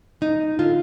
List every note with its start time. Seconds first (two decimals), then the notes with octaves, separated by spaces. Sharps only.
0.21 D2 D#4
0.59 D3 F4